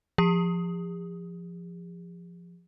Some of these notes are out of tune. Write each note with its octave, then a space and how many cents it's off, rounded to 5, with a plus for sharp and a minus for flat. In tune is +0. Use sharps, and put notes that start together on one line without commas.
F3 +0 G#4 -45